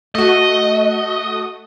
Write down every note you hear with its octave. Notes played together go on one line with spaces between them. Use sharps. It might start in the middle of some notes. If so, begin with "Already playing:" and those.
A3 F#4 D#5